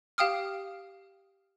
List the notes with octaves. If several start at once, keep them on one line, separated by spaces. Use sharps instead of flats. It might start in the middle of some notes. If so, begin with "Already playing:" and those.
G4 F5 G5 D#6 F6